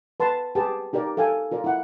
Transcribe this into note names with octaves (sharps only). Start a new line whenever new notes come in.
B4 A5 C6
G4 G#4 B4 A5
D#4 G4 A#4 D5
A4 F5 G5 G#5
F4 A#4 D5
E4 F#5